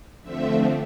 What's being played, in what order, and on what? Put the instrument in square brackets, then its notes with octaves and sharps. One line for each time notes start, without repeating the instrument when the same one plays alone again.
[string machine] D3 F3 A3 C4 E5